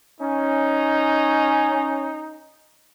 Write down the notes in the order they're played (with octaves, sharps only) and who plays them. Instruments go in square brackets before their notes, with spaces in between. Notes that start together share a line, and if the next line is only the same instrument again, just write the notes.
[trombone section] C#4 [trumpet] D#4